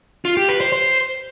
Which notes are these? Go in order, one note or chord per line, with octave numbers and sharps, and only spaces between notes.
F4
G4
B4
C5
C5